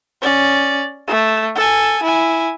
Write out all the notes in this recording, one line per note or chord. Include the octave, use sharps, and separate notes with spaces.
C#4 D5
A3
A4 G#5
E4 G#5